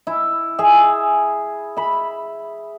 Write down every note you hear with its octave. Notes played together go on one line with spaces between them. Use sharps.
E4
G#4 E5
E5 B5